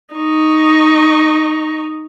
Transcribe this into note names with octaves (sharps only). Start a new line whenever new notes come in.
D#4 C#6